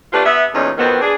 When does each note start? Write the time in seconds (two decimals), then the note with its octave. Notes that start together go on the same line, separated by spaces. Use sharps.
0.13 A3 D4 F4 G4 B4
0.25 B3 E5
0.53 E2 A#2 D3 C#4 D#4
0.78 F2 B2 D#3 B3 C4
1.01 D4 G#4